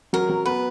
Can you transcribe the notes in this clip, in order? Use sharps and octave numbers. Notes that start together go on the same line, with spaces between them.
F#3 A#4
F#3
B3 B4